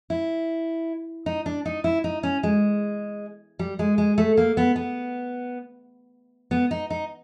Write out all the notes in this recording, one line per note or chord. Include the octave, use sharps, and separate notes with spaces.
E4
D#4
D4
D#4
E4
D#4
C#4
G#3
G3
G#3
G#3
A3
A#3
B3
B3
B3
D#4
D#4